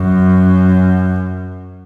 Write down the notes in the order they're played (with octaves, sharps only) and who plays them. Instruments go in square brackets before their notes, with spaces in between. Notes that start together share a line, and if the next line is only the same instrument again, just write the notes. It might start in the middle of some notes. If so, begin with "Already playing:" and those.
Already playing: [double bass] F#2